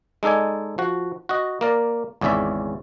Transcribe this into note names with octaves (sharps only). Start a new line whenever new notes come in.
G#3 D#4 A4 D5 G#5
F3 F#4
F#4 D#5
A#3 A#4 D5
G#1 E2 C#3 C#4 D5 E5